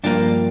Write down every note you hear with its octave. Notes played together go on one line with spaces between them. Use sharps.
G2 F3 A#3 D4